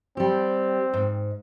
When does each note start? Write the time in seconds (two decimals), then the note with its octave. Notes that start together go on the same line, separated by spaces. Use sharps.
0.17 G3 C4 G4
0.94 G#2